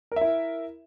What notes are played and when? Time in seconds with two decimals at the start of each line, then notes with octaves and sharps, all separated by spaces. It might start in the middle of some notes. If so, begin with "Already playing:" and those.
0.12 A#4
0.16 E5
0.21 E4